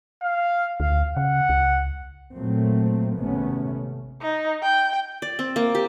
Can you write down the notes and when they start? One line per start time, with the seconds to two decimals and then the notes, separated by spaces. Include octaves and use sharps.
0.22 F5
0.80 D2 F5
1.17 C#3 F#5
1.49 C#2
2.34 A#2 F#3 A3 A#3 C4
3.16 G#1 G#2 C3 A3 B3 C#4
4.21 D#4
4.62 G5
5.22 D5
5.39 C4
5.56 A#3
5.75 G4